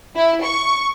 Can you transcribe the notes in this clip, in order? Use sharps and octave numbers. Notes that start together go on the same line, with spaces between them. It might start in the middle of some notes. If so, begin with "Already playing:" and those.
E4
C#6